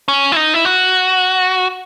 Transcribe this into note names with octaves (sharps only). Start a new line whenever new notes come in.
C#4
E4
D#4
E4
F#4